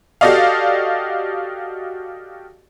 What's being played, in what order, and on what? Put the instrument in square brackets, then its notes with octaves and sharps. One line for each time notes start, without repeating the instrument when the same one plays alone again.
[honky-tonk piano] F#4 G4 A4 D5 D#5 F5